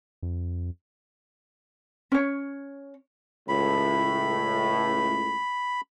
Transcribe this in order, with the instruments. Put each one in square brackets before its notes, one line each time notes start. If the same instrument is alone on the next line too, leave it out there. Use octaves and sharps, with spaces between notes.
[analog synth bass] F2
[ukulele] C#4 C#5
[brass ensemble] C#2 A2 [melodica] B5